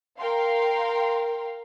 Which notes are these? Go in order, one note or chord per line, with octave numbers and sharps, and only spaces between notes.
A#4 F5 G5 C6